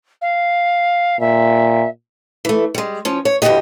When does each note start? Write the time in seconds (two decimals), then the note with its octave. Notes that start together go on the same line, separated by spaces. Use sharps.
0.21 F5
1.20 A#2 E5
2.45 E3 A3
2.74 G3 G#3
3.05 F3 C#4
3.25 C#5
3.42 E2 G2 D3 F#4 G4 D#5